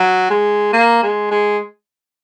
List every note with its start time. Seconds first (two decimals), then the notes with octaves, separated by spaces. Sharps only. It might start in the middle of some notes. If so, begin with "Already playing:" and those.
Already playing: F#3
0.30 G#3
0.73 A#3
1.03 G#3
1.31 G#3